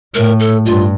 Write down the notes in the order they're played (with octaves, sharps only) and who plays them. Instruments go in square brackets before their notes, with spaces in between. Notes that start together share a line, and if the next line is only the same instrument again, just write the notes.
[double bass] A2 [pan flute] A#4
[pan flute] A4
[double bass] G2 [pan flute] F4